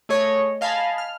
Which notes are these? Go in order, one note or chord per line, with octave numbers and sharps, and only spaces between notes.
A3 G#4 C#5 D#5
D#5 F5 G#5 A5 B5
F6